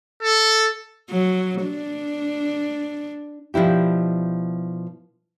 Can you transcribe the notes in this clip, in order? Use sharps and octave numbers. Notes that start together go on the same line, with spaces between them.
A4
F#3
D4
B2 F3 D4 E4 G4